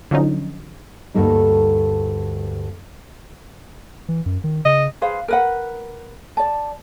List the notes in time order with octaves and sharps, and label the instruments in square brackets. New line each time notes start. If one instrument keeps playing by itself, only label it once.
[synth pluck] D3 F3 F#3 C#4 D#4
[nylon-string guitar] D2 G2 A3 A#3 D#4
[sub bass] E3
F#2
D#3
[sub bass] C#3 [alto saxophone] D#5
[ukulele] G#4 B4 C5 F5
A#4 B4 F#5
D5 A5